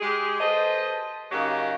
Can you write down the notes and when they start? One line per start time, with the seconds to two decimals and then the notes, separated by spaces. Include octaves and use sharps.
0.01 G#3 G4 G#4
0.41 A4 B4 C5 D#5
1.32 C#3 F#3 A#3 D#4 F#4 G4